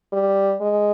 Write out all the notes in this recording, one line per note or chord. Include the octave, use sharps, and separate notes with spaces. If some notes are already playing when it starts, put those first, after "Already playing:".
G3
G#3